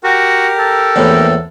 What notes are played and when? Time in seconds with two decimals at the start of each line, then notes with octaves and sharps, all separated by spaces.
0.04 F#4 G4 A#4
0.58 A4
0.96 A#1 E2 A2